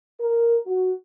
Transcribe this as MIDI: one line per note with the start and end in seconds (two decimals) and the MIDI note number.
0.20 0.58 70
0.67 0.92 66